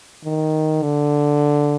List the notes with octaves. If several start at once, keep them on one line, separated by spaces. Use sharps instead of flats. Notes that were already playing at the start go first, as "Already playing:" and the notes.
D#3
D3